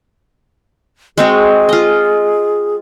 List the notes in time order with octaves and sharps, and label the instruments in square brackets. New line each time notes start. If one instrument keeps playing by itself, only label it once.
[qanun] G#3 C4 F#4 [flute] G#4
[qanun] F4 D#5